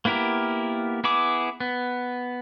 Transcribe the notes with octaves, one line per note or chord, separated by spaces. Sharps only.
A#3 B3 E4 G4 A#4
B3 E4 G#4 D6
B3